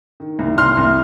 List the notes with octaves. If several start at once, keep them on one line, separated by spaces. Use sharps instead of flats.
D#3
C2
C3 C6 F6
C2